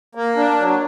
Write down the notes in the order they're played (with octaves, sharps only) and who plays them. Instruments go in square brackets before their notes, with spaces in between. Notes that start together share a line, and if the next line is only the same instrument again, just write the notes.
[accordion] A#3
D4
F#3